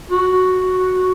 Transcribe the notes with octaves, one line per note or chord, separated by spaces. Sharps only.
F#4